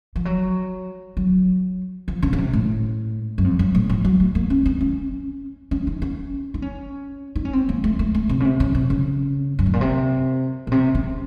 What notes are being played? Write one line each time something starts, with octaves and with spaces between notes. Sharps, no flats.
F3
F#3
F#3
F3
C#3
C#3
C3
A2
F#2
F2
F#2
A2
F3
F#3
A3
A#3
C#4
C4
C#4
C#4
D#4
C#4
D#4
C#4
D#4
C#4
C4
A#3
A3
A3
A3
C3
C#3
C3
C#3
C3
C#3
F#2
A2
A#2
C3
A#2
C3
C#3